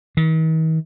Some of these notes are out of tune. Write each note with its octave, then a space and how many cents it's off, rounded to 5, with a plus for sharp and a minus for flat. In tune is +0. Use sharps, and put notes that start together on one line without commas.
D#3 +45